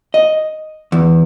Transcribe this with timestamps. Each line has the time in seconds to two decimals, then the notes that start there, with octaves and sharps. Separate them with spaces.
0.14 D#5
0.92 E2